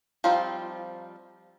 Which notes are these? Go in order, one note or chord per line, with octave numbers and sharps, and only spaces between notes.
F3 G3 C4 D#4 F4